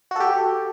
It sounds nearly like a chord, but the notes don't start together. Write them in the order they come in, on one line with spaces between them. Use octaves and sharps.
F#4 A4 G4